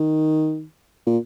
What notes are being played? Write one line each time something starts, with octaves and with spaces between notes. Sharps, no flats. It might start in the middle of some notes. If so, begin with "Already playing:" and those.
Already playing: D#3
A#2